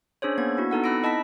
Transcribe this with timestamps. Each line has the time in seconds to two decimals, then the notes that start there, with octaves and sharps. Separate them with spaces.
0.22 C#4 D4 G#4 C5 C#5
0.38 A#3 B3 G#6
0.57 D4 E4 F#4
0.71 B3 D#4 A4 F#5
0.84 C4 D#4 B5 E6 A#6 D7
1.03 E4 D#5 A5 B5 B6